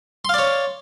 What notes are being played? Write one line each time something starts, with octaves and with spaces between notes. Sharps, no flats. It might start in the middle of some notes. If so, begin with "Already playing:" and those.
C#5 D5 F5 C6